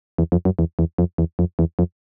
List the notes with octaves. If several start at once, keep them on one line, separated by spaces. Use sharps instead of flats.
E2
F2
F#2
E2
E2
F2
E2
F2
E2
F2